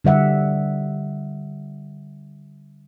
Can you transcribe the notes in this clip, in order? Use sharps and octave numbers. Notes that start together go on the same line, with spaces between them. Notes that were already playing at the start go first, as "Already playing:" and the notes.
D3 G3 E5 F#5